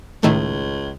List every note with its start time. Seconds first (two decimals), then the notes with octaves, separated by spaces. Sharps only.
0.23 C#2 A2 D#3 A3